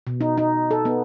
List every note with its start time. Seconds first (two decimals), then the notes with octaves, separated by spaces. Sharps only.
0.07 B2
0.21 D#4
0.38 D#4
0.71 A4
0.85 B3